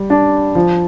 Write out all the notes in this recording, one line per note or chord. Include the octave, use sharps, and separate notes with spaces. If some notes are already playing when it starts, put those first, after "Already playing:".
Already playing: G3
D4
F3